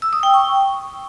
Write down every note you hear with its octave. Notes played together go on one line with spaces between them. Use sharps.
E6
D#6
G5
C#6